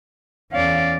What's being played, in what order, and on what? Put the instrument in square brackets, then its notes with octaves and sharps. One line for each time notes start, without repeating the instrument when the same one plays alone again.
[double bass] E2 [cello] C#4 D5 [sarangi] F5